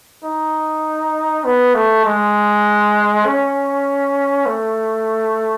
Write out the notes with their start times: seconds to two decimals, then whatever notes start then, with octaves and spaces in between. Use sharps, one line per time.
0.24 D#4
1.44 B3
1.74 A3
2.04 G#3
3.26 C#4
4.46 A3